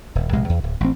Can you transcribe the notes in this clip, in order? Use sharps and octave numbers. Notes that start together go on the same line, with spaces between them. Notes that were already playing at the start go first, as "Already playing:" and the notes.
D#1
A#1 C3 G#3
E2
D1
A1 C4